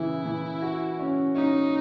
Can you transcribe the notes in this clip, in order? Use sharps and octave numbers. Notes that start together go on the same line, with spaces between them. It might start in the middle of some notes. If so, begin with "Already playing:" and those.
Already playing: C#3 E3 E4
E3
F#4
C#4
C#4 D#4